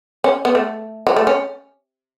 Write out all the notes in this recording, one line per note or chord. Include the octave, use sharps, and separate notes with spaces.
C#4
B3
A3
F#3
A3
C#4